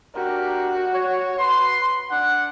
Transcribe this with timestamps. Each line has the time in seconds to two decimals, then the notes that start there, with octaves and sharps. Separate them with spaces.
0.15 D4 F#4 G4 A#4
0.94 C#5
1.39 B4 C6
2.11 D4 F#5